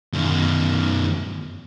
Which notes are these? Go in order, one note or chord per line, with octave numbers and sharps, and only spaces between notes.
F#2 D#3